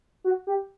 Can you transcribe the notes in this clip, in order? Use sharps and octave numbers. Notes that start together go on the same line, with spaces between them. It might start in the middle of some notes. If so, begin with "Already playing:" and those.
F#4
G4